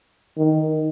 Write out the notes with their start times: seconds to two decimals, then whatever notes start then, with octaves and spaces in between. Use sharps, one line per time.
0.38 D#3